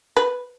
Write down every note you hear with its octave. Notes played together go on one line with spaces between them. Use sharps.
B4